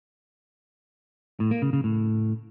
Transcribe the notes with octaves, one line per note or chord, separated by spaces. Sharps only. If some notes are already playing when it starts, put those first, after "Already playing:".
A2
A#3
C#3
C#3
A2